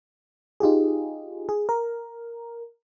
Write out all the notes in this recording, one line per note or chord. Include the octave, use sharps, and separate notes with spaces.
D#4 F4 G4 G#4
G#4
A#4